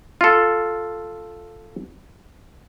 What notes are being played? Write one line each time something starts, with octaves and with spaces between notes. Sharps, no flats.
F4 A4